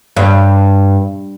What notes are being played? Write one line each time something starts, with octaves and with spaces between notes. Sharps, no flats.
G2